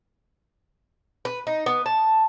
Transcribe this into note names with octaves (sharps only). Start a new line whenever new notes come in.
B4
D#4
B3
A5